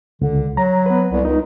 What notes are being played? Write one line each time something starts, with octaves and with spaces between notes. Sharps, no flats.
C#2 D3
F#3 A#5
B3 B4
C2
C#2 D#4